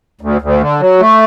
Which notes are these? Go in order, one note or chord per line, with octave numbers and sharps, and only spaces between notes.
D2
D2
D3
F#3
A3